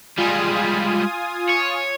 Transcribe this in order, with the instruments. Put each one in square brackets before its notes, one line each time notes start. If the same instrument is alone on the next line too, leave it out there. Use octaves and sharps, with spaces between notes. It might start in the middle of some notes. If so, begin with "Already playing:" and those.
[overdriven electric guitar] G3 G#3 [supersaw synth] F4 G#5 D#6
[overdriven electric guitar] C#5